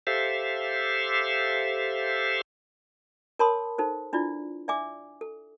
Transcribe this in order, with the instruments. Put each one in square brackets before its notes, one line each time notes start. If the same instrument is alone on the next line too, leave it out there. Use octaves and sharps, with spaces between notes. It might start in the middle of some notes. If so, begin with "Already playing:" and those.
[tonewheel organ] G4 A4 C5 E5 F5
[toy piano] A#4 C#5 A5 B5 C6 D#6
D#4 A4 C5
D4 E4 F4 D5
D5 E5 G#5 D6
A4